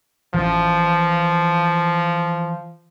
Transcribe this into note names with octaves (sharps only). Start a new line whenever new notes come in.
E3 F3 C#4